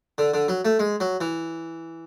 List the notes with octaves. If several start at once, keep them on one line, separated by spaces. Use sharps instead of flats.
D3
D3
F#3
A3
G#3
F#3
E3